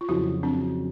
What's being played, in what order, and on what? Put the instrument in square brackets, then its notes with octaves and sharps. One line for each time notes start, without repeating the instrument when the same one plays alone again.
[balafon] F4
[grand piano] F2 C#3 F#3 [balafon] E4 F#4
[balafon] C4 D4